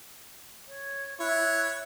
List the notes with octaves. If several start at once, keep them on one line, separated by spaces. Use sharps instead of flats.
C#5
E4 C#5 F#6